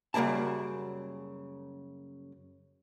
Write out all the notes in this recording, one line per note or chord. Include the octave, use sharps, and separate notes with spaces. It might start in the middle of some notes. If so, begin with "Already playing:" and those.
F#2 C#3 G3 A#3 A5